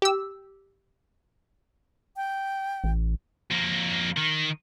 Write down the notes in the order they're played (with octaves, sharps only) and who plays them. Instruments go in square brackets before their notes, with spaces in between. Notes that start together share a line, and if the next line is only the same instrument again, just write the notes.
[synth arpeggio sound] G4 E6
[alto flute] G5
[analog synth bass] A1
[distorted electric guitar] F2 A#3
D#3